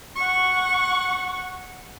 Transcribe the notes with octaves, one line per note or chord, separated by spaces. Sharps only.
F#5 C#6